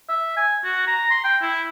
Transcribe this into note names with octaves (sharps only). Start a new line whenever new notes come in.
E5
G#5
F#4
A#5
C6
G5
E4